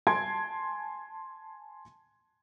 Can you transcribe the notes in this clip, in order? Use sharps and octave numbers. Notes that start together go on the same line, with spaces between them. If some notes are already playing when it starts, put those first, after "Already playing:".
G#5 A5 C6 G#6 C7 D7